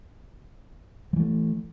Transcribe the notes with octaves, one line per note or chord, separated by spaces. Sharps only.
E3 F#3 A3